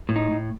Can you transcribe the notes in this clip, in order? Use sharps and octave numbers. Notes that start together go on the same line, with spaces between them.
A2
D#4
A2